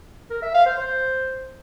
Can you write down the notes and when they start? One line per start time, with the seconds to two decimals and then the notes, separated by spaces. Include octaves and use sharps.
0.30 A#4
0.42 E5
0.54 F5
0.66 C5
0.78 C5